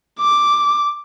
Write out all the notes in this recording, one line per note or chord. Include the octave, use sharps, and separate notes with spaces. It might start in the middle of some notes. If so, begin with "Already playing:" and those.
D6